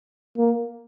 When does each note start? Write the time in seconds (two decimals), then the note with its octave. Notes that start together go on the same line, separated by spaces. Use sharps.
0.38 A#3